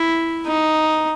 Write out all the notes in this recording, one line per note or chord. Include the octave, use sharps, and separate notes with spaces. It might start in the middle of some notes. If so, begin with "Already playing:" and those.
Already playing: E4
D#4